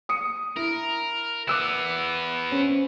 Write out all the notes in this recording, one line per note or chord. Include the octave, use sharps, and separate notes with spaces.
D#6 C#7
E4 A#4
B3 E4 D6 E6 F#6
C#4 C5